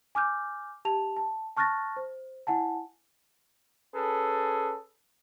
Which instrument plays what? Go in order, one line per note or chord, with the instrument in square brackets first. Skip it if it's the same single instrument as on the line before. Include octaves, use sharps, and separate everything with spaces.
[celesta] G#5 D6 F6 G6
G4 A5 F7
A5
A5 C#6 F6 F#6 A6 A#6
C5
E4 F#5 G#5 A5
[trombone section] C#4 G#4 A4 B4